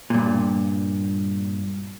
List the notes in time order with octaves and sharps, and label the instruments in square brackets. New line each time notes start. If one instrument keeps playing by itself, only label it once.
[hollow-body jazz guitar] G2 A#2